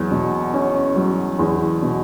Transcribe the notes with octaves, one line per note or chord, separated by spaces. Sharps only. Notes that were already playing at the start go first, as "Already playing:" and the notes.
Already playing: E2 F#3
B2
C#4
F#3
E2
B2